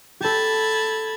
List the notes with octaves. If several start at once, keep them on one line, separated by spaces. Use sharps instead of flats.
G4 A4 A5 B5 G#6